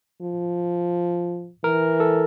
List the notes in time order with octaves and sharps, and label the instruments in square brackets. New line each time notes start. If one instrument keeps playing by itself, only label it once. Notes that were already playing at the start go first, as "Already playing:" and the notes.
[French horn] F3
[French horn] E3 [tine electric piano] A#4
[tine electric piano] A4